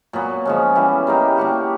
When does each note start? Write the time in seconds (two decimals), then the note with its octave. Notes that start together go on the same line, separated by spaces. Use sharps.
0.13 A#2 F#3 B3
0.45 F3 G#3 C#4
0.75 E3 G3 B3
1.07 G3 A#3 D#4 G4
1.38 G3 A#3 D4 F#4